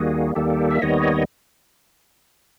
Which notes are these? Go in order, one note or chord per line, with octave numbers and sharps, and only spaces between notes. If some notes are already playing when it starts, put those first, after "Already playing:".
Already playing: D#2 D#3 G3 A#3 F#4 G#4
D#2 D#3 G3 A#3 G4 A4
E5
D#2 D#3 G3 B3 C#5 D#5